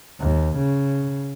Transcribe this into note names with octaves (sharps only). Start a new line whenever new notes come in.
D#2
C#3